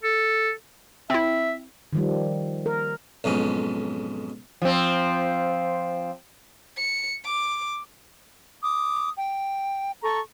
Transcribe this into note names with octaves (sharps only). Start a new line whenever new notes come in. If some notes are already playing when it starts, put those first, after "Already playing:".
A4
C4 E4 E5
D#3 F3 G3
A#4
B1 F2 G#2 C#4
F3 C4
C#7
D6
D6 D#6
G5
A4 A#5 C#6